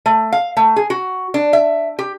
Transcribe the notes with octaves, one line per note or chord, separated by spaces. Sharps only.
A3
F5
A3
G#4
F#4
D4
E5
G4